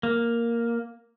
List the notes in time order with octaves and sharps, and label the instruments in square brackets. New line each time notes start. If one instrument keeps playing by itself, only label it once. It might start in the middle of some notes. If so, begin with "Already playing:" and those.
[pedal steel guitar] A#3